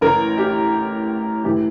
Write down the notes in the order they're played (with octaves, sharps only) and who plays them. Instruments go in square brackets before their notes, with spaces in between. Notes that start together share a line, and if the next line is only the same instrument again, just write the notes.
[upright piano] A1 A2 E3 A#4
G4
A2 E3 G4